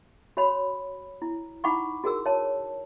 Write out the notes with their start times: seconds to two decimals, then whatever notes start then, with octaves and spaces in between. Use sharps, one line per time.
0.37 F#4 C#5 B5
1.22 E4
1.64 D#4 E4 F#5 B5 C#6 D6
2.04 F#4 G#4 A#4 E6
2.26 C#5 A5